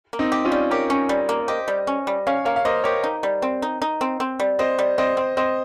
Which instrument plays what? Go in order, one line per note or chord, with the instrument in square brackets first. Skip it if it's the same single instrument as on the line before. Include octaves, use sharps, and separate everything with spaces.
[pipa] A#3
[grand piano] C4 D#4
[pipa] G4
[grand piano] C#4 F4
[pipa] G3
[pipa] G4 [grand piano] A#4 C#5
[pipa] C#4
G3
A#3
[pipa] G4 [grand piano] C5 D#5
[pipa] G3
C#4
G3
[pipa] C#4 [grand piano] C#5 F5
[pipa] A#3 [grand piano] C#5 F5
[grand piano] F5
[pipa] A#3 [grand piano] C5 D#5
[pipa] G4 [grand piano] A#4 C#5
[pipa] D#4
G3
C4
D#4
D#4
C4
C4
G3
[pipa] C4 [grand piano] C5 D#5
[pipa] G3
[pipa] C4 [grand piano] C5 D#5
[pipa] C4
[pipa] C4 [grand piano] C5 D#5